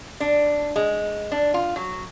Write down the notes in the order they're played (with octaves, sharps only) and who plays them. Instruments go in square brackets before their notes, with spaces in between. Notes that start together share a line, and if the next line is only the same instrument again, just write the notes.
[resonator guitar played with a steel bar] D4
G#3
D4
F4
F#3